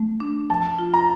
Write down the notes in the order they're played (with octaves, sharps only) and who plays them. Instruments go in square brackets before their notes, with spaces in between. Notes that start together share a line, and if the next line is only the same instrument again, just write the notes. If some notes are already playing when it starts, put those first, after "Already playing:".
Already playing: [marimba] A3
D4
[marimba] F3 [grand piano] A5
[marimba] F4
[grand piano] A#5